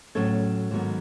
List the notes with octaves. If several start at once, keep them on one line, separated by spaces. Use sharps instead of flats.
A2 F#3 C#4 A4 C#5
G#2 D#3 F#3 B3